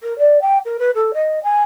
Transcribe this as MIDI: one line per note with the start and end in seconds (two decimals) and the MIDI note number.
0.03 0.17 70
0.18 0.40 74
0.41 0.58 79
0.65 0.77 70
0.79 0.90 71
0.94 1.11 69
1.13 1.39 75
1.43 1.63 80